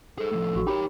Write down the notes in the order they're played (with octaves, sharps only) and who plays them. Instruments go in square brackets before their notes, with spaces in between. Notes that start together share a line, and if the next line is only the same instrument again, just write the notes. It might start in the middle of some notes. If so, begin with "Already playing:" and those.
[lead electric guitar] G#4 C5 [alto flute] A4
[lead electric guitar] A2 F3
[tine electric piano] A1 [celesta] F#4 C#6
[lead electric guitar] D#4 C#5 [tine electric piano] G4 [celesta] A#4 G5 B5